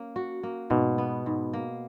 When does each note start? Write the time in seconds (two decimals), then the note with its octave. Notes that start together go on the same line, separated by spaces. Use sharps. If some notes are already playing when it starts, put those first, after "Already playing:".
Already playing: A#3 C#4
0.16 F#4
0.43 A#3
0.70 G#2 B2
0.98 B3
1.26 G#2
1.53 A#3